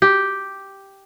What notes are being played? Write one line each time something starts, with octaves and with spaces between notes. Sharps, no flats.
G4